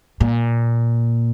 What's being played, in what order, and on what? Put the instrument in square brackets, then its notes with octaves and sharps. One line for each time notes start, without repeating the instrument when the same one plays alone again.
[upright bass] A#2